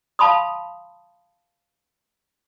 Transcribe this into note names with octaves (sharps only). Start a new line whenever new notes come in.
F5 A5 B5 C6 D#6